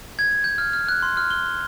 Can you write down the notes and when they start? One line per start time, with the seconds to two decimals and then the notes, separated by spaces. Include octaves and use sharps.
0.19 G#6
0.44 G6
0.58 F6
0.73 F6
0.89 F#6
1.03 C6
1.17 F6
1.30 G7